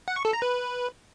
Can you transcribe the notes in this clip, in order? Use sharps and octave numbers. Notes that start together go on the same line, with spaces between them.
F#5
C#6
A4
A#5
B4